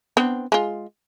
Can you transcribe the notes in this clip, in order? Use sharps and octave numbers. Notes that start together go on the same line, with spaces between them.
B3 C4 D4
G#3 F4